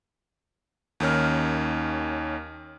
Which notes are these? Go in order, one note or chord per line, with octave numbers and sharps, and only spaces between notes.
D#2 D#3 C#4 F6